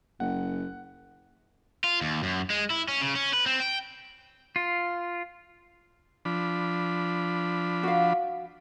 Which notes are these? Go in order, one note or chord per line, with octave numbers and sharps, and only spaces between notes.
F#1 F#5
F4
D#2
F#2
G#3
E4
C#4
C#3
C#4
B4
C4
G5
F4
F3 D4 B5
F#4 F5